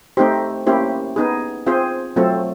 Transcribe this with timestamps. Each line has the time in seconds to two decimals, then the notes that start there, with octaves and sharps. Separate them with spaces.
0.17 A3 C4 D#4 G4 C5
0.67 A#3 C#4 E4 G4 C5
1.16 B3 D#4 G#4
1.66 C4 F4 G#4 C5
2.16 F#3 A3 C4 F4 A4